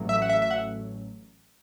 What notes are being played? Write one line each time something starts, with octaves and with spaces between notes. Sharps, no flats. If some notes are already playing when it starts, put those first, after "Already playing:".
Already playing: A1 A2 F#3
E5
F#5
E5
E5
F#5